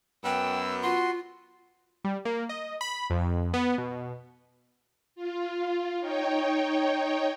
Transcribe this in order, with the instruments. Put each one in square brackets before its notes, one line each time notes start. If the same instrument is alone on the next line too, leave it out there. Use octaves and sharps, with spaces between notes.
[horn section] F#2 [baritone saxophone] B3 [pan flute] G5 [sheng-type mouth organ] E6
[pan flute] F4 [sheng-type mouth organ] F#4 C6
[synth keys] G3
A#3
D#5
B5
F2
B3
B2
[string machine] F4
D#4 C#5 G5